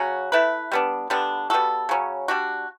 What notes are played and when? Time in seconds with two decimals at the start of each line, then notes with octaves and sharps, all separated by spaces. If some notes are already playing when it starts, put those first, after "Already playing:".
Already playing: C#3 F#3 C#4 F#4
0.32 A3 E4 B4
0.72 G3 B3 D4
1.10 D3 G3 B3 D4
1.50 G3 B3 F#4 A4
1.89 C#3 F#3 C#4
2.28 G3 D4 F#4